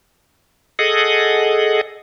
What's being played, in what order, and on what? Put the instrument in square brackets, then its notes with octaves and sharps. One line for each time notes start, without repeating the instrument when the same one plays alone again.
[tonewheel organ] G#4 A4 D#5 F#5